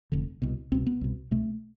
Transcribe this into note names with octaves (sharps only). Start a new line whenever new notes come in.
F1 F2 D3
C2 B2
C2 B2 C4
B3
C2 B2
C2 B2 A3